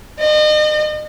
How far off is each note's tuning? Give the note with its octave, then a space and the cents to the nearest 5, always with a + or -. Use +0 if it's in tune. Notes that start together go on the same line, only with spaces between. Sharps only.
D#5 -35